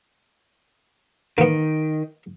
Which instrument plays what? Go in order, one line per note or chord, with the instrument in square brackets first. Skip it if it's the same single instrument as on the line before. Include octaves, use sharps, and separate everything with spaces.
[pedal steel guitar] D#3 [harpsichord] A#3 B3